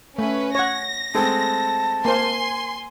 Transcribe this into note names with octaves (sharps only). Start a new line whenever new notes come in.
A3 C#4 B4
C#5 F#5 A#6
G#3 A3 C4 A5
A#3 C5 G#5 C6